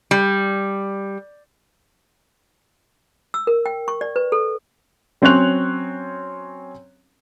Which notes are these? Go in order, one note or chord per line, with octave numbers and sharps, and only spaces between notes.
G3
E6
A#4
G5
C#6
D5
B4
A4
F#3 C4 C#4 C#5 F#6 F7